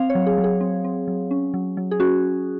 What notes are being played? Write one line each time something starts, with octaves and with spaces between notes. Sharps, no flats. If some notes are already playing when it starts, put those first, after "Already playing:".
Already playing: C4 F5
C#5
F#3
G#4
F#3
G#4
C4
C4
F#3
C#4
F#3
F#3
G#4
C#4 F#4